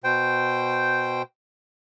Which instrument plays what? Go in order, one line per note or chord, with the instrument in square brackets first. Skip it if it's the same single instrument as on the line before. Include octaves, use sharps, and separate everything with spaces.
[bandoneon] B2 C5 G5